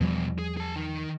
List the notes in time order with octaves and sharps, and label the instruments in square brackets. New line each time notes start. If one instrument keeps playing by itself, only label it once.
[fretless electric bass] E2 F3 G3 [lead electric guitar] B2 E3
[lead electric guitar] G#4
G#4 A5
D#3 D#4